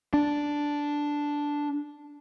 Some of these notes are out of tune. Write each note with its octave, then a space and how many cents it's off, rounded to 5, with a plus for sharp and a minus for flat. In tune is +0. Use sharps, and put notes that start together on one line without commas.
D4 -5